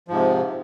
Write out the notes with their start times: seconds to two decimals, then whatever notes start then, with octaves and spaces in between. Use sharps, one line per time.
0.08 F3
0.11 G#2
0.14 C3